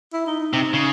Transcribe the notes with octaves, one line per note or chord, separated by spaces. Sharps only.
E4
D#4
D#4
C3 D#4
C#3